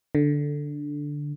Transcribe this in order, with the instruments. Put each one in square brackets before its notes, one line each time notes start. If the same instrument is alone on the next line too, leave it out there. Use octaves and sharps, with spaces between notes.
[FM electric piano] D3